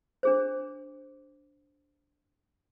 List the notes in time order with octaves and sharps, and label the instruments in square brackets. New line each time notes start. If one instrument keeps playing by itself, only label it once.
[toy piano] D4 G#4 C5